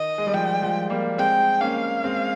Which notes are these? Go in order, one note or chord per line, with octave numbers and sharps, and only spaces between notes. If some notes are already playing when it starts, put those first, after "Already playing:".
Already playing: D#3 D#5
G#3
G3
F3 G5
F3 G#3
G3 A#3
G#3 C4 G5
A#3 C#4 F5
G#3 C4